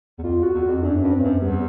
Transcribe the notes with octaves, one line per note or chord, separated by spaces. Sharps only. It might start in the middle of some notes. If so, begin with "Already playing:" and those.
E2
F2 F4
E2
F#4
E2
F#4
F2
F#2 D4
G2 C#4
C4
F#2 B3
E2 G3